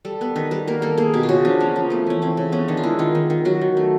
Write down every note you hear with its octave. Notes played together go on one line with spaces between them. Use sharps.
G3 A4
B3 B4
D#3 B4
G3 B4
A#3 A#4
A#3 A4
A#3 G#4
B2 G4
F4
C#3 F#4
F3 D4
A#3 C#4
F3 C#4
A3 B3
E3 C#4
E3 C4
C#3
B3 C#4
D#3 D4
F4
G#3 E4
D#3 F4
D#3
D#3
F#3 F#4
D#3
A3